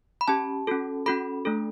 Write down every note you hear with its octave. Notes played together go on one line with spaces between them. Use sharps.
B5
C#4 G4 A5
C#4 F#4 A4
C#4 F#4 A4 B5
A3 D4 A4